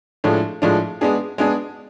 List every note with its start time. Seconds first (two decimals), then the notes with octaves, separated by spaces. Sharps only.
0.24 A2 F3 G#3 D4
0.62 A2 F3 G#3 D4
1.01 G#3 B3 D4 G#4
1.38 G#3 B3 D4 G#4